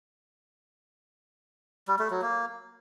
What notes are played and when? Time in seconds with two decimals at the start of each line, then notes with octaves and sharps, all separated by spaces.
1.88 G3
1.99 A3
2.11 F#3
2.22 A#3